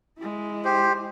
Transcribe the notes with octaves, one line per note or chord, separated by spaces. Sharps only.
G#3 E4
G4 C5